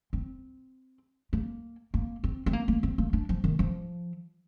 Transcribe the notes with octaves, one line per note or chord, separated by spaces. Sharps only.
C4
A#3
A#3
C4
C4
A#3
A#3
C4
A#3
D4
F3
D#3
F3